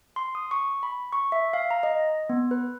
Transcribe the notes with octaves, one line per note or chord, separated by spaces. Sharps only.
C6
D#6
C#6
B5
C#6
E5
F5
A#5
D#5
B3
B4